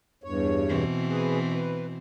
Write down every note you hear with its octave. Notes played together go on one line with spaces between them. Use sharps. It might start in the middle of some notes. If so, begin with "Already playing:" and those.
E2 G2 C#5
B2 E3 C4
G#4 B4
B4